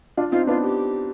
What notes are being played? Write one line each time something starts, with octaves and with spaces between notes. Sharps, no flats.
D4 F4
C4 D#4 F4
B3 D4 F4
G4